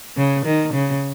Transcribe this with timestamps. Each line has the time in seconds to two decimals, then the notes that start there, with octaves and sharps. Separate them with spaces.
0.17 C#3
0.45 D#3
0.74 C#3